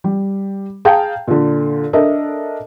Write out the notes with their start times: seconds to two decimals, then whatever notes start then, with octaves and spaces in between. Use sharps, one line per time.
0.04 G3
0.85 G#4 F5 G5 A5 A#5
1.27 A#2 D3
1.93 D4 A4 A#4 D#5 E5